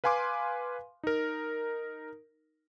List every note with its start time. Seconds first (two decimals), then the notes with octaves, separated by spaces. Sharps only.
0.04 B4 F5 G#5 C6 D6
1.03 D#4 A#4